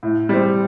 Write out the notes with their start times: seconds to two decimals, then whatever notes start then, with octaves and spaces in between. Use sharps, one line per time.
0.03 A2
0.29 G3 C4